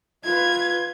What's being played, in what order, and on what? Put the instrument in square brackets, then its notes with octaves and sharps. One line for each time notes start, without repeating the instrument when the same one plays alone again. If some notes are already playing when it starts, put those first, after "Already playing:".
[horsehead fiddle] F4 B4 [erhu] G#6